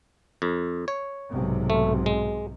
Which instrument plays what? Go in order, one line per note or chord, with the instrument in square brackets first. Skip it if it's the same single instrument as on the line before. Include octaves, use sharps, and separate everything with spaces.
[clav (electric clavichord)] F2
C#5
[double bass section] B1 G#2 C3
[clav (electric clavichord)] A3
G#3